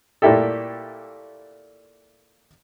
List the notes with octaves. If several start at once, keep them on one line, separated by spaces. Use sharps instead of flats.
A#2 A3 E4 G4 A4